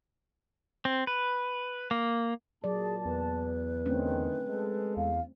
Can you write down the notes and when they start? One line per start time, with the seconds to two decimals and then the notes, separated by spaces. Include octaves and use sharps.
0.85 C4
1.07 B4
1.91 A#3
2.64 A#2 F#3 G#4 D5 A5
3.05 E2 B4
3.86 D3 D#3 A3 C4 C#4
4.46 G#3 A4
4.97 E2 F5